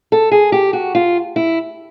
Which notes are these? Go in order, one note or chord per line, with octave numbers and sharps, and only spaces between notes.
A4
G#4
G4
F#4
F4
E4